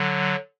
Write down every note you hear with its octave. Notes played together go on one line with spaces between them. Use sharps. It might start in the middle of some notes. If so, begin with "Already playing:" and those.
Already playing: D3 F#3